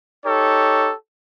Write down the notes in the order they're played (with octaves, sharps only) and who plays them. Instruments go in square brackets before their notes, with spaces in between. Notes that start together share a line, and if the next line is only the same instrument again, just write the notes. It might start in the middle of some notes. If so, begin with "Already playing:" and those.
[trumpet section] D#4 G4 A4 C#5